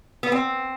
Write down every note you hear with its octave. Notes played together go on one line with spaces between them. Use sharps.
B3
C4